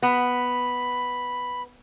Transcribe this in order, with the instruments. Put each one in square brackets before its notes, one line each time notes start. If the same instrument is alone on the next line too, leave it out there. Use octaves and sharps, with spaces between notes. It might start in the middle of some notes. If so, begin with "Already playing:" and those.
[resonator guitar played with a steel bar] B3 [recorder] B5